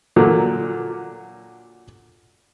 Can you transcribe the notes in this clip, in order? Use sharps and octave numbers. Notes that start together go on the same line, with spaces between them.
A#2 D3 F#3